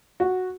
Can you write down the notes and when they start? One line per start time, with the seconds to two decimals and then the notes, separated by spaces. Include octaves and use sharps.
0.20 F#4